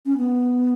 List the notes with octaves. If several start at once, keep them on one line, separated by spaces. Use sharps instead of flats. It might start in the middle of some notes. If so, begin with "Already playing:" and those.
C#4
B3